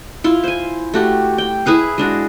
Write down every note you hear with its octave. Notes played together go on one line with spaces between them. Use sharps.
E4 F4
C5 G#5
A3 F#4 G4
G5
E4 G#4 B4 F5
G#3 D4 F#4